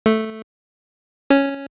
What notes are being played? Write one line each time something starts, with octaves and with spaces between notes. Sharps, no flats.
A3
C#4